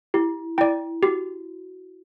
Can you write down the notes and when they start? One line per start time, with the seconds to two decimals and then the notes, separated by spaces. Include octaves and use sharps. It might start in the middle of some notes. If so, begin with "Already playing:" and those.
0.14 E4 G4
0.58 E4 D5 G5
1.03 F#4 G4